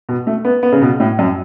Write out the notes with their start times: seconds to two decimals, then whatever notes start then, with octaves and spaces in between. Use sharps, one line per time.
0.09 B2
0.27 A3
0.45 B3
0.63 B3
0.72 C#3
0.82 B2
1.00 A2
1.19 F#2